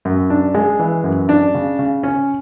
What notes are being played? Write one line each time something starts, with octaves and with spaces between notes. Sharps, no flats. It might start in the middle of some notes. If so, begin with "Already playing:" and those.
F#2
D4
G#3
E3
F#2
D4
C#3
C#3
C#4